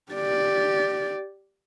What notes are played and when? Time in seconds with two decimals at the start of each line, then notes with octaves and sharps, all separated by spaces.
0.12 G4 D5